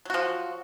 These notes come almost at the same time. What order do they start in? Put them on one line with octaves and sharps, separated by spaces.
F#3 F#4 F3